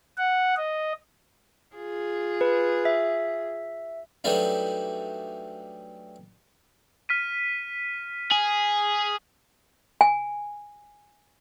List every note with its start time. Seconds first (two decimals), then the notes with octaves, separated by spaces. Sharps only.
0.18 F#5
0.56 D#5
1.76 F4 G#4
2.41 B4
2.85 E5
4.24 E3 F#3 G3 A3 D4 D#4
7.09 F6 B6 D#7
8.31 G#4
10.01 G#5